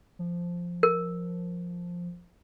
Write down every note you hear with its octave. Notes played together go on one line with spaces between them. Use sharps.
F3
A#4